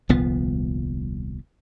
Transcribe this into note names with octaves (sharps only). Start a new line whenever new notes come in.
D#1 C2 F3 B3